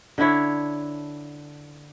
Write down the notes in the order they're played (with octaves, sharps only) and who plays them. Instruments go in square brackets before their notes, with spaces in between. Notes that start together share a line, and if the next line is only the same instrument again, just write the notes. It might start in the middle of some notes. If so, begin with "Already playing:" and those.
[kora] D3 D4 E4 C#5